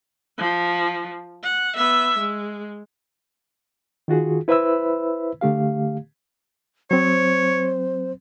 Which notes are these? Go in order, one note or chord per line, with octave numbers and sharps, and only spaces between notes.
F3
F#5
B3 E5
G#3
D#3 F4 F#4 G#4
E4 B4 C5 E5 B5 E6
D3 A3 G4 F5
F#3 C4 C5 C#5